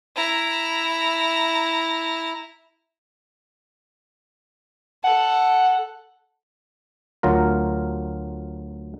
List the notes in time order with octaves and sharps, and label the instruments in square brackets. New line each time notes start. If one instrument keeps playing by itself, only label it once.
[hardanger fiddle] E4 A#5
[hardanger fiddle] A4 [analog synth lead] F#5
[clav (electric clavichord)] D2 F#3 F4 A#4